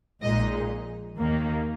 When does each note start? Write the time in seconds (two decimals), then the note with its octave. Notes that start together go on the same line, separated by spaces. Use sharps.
0.23 A#1 A#2 G#3 D#4 D#5
1.17 D#2 D#3 A#3